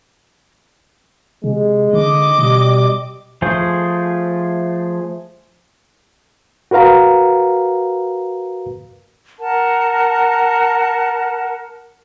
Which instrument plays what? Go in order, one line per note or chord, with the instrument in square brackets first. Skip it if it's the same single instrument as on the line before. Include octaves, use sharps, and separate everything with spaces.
[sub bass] C3 [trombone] G#3
[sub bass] D3 [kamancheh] D#5 D6
[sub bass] B2 [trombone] G3
[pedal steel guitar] F3 A3 G#4 C5
[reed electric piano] F#4 A#4 B4 F5 A#5
[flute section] A#4 F#5 A5